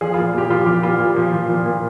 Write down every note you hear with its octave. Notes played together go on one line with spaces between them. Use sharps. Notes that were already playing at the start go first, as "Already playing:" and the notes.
F3 G#4
F4
A#2
A#2 G4
F3 F4
F3 G4
A#2 F4
A#2
F3
F3
A#2
A#2